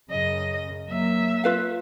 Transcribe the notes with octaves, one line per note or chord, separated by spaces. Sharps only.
F#2 C#3 D#5
F#3 A#3 E5
F4 B4 F5